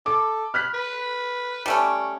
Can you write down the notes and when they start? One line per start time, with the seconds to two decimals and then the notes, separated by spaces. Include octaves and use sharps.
0.06 A4 D6
0.54 B5 F6 F#6 B6
0.74 B4
1.66 G3 A3 C#4 D5